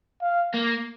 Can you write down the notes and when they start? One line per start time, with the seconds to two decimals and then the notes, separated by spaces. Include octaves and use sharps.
0.22 F5
0.54 A#3